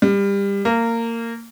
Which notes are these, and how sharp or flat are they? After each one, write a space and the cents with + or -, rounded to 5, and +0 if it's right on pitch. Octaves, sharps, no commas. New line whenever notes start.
G3 +25
A#3 -20